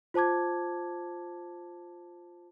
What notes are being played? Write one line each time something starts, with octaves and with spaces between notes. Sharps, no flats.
F4 C5 A5 D6 G#6